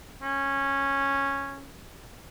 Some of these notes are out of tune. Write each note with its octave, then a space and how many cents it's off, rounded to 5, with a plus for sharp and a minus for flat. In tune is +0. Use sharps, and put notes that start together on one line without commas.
C#4 -10